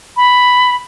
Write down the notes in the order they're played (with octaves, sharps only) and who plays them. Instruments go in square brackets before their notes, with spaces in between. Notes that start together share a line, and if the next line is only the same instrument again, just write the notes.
[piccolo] B5